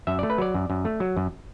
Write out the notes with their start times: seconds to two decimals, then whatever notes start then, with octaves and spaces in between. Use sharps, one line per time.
0.07 F#2 E5
0.19 A3 D5
0.30 B4
0.38 F#3 D5
0.54 F#2
0.70 F#2
0.85 A3
1.00 F#3
1.17 F#2